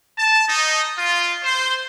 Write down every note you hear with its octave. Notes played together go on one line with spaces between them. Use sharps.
A5
D#4
F4
C5